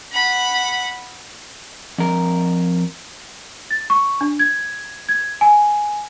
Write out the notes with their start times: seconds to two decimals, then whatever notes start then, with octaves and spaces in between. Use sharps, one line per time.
0.13 F#5 B5
1.99 F2 A#4
3.71 A6
3.90 C#6
4.21 D4
4.39 G#6
5.09 G#6
5.41 G#5